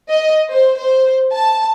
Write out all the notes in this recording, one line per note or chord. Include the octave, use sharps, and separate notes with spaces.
D#5
C5
C5
A5